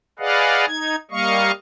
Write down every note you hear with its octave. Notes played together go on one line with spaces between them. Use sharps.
G#4 B4 D5 D#5 F5 F#5
D#4 G#6
G3 A#3 D#5 F5 C#6